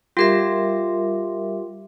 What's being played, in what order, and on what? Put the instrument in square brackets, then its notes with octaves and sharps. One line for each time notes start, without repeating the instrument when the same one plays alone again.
[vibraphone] G3 A#4 E5 [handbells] F4 G4